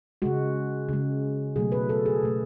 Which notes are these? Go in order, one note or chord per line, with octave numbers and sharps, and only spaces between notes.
C#3 G#3 F#4
C#3 G#3
B2 F#3 A3 G#4
B4
A4
G#4
B2 A3